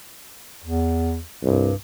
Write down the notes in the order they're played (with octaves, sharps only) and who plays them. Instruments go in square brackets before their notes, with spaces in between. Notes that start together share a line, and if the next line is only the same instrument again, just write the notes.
[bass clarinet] E2
[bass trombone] C2 [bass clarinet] G2